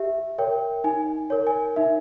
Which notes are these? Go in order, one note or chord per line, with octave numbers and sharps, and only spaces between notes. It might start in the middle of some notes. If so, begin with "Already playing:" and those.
Already playing: G4 E5
A#4 C#5 G5
D#4 G#5
A#4 C#5
G#5
D#4 E5